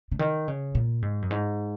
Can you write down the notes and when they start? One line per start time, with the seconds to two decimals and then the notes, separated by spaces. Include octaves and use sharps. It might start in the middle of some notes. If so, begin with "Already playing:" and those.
0.11 C#3
0.19 D#3
0.48 C#3
0.75 A#2
1.02 G#2
1.22 F#2
1.31 G#2